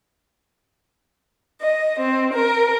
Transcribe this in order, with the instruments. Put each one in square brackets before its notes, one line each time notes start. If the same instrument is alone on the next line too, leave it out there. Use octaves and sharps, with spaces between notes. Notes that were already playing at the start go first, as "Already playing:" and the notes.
[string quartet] D#5
C4
A#4